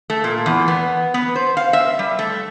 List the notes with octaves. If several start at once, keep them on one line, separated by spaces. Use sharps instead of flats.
A3
A#2
E2
B3
B3
C5
F5
E5
G3
A3